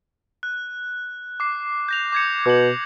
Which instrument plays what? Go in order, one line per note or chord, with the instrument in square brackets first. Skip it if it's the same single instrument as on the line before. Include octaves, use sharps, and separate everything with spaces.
[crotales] F#6
D6 C7
G6 A#6 F7
D6 G#6 C#7
[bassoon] B2 [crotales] D6 F#7